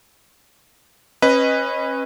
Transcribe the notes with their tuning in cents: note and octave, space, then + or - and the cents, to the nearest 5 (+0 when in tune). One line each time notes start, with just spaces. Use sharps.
C#4 -35 B4 +0 D#5 +0